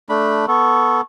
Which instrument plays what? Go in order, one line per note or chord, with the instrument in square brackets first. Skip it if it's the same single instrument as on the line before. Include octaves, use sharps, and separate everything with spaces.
[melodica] A3 D4 B5
[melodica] B3 A4 [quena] C#6